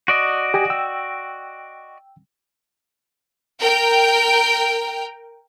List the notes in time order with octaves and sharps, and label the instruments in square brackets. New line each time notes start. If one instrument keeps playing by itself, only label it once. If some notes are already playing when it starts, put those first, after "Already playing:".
[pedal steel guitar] F#4 D5 D#5
[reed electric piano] G4 G#5 D#6
G5 E6
[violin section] A#4 G5